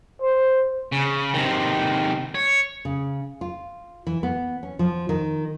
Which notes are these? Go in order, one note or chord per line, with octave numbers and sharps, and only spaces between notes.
C5
C#3
C3 D#3
C#5
C#3
F4
E3
B3
C#4
F3
D#3